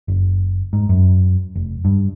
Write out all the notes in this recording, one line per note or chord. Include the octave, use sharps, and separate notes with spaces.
F#1
G#2
F#2
F1
G2